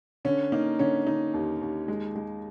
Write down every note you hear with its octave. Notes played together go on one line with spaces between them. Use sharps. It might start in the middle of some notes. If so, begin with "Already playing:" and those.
D3 C#4
A#3 D#4
D3 C#4
D3 D#4
D#2
D#2
G#3
G#3